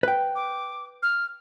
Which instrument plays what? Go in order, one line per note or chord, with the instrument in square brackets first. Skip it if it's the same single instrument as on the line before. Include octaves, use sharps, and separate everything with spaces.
[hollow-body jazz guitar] B4 G5
[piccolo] D6
F6